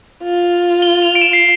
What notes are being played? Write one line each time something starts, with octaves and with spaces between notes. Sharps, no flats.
F4
G7
F7
D7
E7
C7